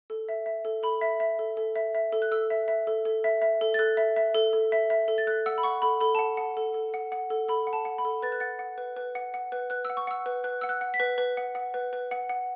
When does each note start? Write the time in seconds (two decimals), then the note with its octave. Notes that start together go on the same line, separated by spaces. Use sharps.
0.10 A4
0.29 E5
0.46 E5
0.65 A4
0.83 A4 B5
1.01 E5
1.20 E5
1.39 A4
1.57 A4
1.76 E5
1.95 E5
2.13 A4
2.22 F#6
2.32 A4 E6
2.50 E5
2.68 E5
2.87 A4
3.05 A4
3.24 E5
3.42 E5
3.61 A4
3.74 A6
3.79 A4 F#6
3.97 E5
4.16 E5
4.34 A4
4.53 A4
4.72 E5
4.90 E5
5.08 A4
5.18 A6
5.27 A4 F#6
5.46 F#5 E6
5.58 B5
5.63 F#5 C#6
5.82 A4 B5
6.01 A4 B5
6.15 F#5 A5
6.37 F#5 A5
6.57 A4
6.74 A4
6.94 F#5
7.12 F#5
7.30 A4
7.49 A4 B5
7.67 F#5
7.73 A5
7.85 F#5
7.98 B5
8.05 A4
8.23 B4 A6
8.32 F#6
8.40 F#5 A6
8.59 F#5
8.78 B4
8.97 B4
9.15 F#5
9.34 F#5
9.52 B4
9.70 B4 F#6
9.85 F#5 E6
9.97 C#6
10.07 F#5 E6
10.26 B4
10.44 B4 F#6
10.61 F#5 E6
10.69 F#6
10.81 F#5
10.94 B6
11.00 B4
11.18 B4
11.37 F#5
11.55 F#5
11.74 B4
11.93 B4
12.11 F#5
12.29 F#5